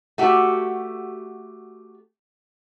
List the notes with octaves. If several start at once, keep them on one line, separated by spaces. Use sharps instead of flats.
A3 F#4 G4